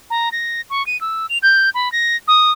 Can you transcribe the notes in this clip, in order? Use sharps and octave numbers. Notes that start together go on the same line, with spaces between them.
A#5
A#6
C#6
D#7
E6
F7
G6
B5
A#6
D#6